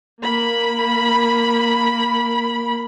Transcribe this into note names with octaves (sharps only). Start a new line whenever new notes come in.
A#3 B5